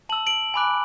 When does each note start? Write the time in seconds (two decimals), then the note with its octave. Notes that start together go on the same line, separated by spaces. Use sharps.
0.09 A5 E6 F#7
0.27 D7 F#7
0.54 G#5 B5 D6 F#6